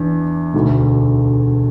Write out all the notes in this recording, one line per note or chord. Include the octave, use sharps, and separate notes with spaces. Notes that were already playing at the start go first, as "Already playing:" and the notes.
Already playing: E2 D4
E1 D2 D3 A3